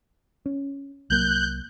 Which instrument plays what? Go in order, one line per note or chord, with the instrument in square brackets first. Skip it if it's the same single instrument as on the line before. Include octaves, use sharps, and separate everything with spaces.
[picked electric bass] C#4
[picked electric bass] C2 F#3 A#3 [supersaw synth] F#6 G6